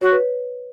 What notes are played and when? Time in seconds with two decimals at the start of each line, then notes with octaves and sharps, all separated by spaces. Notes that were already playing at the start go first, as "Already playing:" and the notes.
0.01 F#4 C#5
0.12 B4